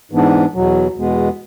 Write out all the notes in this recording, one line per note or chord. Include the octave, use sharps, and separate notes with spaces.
G#2 E3 B3 D4
E2 B2 F#3
E2 B2 G#3 B3